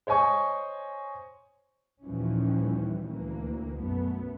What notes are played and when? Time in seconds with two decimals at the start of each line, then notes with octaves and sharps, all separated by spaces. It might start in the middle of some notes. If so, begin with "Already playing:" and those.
0.07 C5 C#5 D#5 G#5 C#6
2.02 D#2 A#2 E3 F3 G3 C#4
3.08 D2 E3 A#3
3.79 B1 F#2 A3 B3